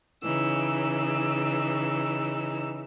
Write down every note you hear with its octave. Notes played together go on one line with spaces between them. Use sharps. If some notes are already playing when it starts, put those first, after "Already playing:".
C#3 E3 D#4 E6